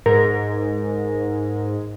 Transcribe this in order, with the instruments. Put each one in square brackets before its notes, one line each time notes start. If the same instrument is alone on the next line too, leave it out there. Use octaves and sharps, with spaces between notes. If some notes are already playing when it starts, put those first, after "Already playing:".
[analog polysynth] G#2 [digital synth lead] A#4